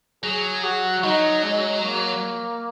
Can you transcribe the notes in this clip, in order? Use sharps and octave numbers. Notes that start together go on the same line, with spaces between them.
F#3 G#4
F#4
F#3 D#4
G#3
A#3